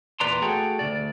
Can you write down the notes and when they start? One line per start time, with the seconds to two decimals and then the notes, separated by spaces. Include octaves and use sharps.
0.20 E2 A#2 B4 D5 A#5 C6
0.42 A3 F#4 G#4 A4 G5
0.79 D2 C3 D5